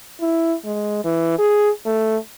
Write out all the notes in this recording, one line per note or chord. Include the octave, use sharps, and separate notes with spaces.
E4
G#3
E3
G#4
A3